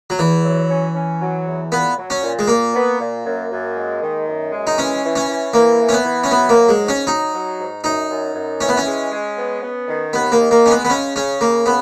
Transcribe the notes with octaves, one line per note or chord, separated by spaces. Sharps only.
F#3
E2 E3
F#3
C#4
C#4
F#3
E2
A#2 B3
F#3
C#4
A#2
G#3
A#2 A#3
B3
A#2
F#2
F#2
G#3
D#3
F#2
G#3
D#4
E3 C#4
E3
C#4
E3
E3 A#3
E3
C#4
B3
E3
C#4
F#3 B3
A#3
F#3
G#3
G#2
C#4
F#3 D#4
F#3
G#2
F#2 D#4
F#2
F#2
E3 C#4
B3
C#4
G#3
G#3
B3
B3
D#3
D#2 B3
A#3
D#3
A#3
G#3 C#4
B3
B3
C#3 C#4
C#3 C#4
C#3 A#3
C#3 B3